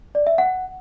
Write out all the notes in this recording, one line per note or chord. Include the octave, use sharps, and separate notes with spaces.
D5
E5
F#5